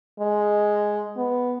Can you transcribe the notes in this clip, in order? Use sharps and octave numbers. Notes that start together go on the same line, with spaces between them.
G#3
B3